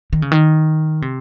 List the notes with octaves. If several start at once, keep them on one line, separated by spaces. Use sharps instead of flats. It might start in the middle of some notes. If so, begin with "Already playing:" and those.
D#3
C#3
D#3
C3